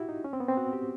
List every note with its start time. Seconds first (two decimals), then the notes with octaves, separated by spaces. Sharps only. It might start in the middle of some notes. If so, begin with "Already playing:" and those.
Already playing: E4 F#4 G4
0.09 D#4
0.24 C#4
0.33 C4
0.40 B3
0.48 C4
0.57 F#4
0.73 G4